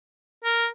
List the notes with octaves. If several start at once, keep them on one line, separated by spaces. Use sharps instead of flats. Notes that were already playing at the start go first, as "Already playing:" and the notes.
A#4